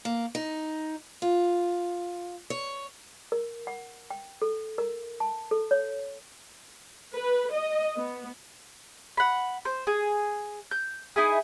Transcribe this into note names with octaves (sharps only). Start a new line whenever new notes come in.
A#3
D#4
F4
C#5
A#4
F#5
G5
A4
A#4
A5
A4
C#5
B4
D#5
B3
F#5 B5
C5
G#4
G6
D#4 E4 G#4